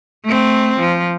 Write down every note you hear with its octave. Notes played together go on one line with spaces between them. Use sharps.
A3 C4
F3